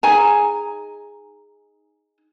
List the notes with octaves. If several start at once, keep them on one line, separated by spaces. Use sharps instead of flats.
D#4 G#4 G#5 A#5